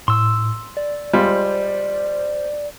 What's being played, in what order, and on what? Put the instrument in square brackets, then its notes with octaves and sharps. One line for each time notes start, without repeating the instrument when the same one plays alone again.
[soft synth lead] A2 [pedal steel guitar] C6 E6
[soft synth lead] D5
[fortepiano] G3 G#3 F4 [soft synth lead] C5 [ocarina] D5